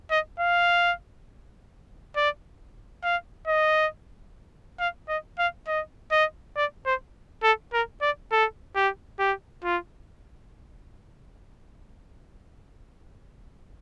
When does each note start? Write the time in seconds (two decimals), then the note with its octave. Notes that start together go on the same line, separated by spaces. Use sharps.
0.11 D#5
0.40 F5
2.16 D5
3.03 F5
3.47 D#5
4.80 F5
5.09 D#5
5.39 F5
5.67 D#5
6.11 D#5
6.56 D5
6.86 C5
7.43 A4
7.73 A#4
8.02 D5
8.32 A4
8.76 G4
9.19 G4
9.64 F4